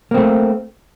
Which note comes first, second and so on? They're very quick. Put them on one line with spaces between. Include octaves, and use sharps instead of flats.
A#3 C4 A3